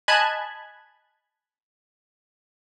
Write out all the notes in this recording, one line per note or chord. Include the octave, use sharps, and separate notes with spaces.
D#5 G#5 A5 B5 F#6 G#6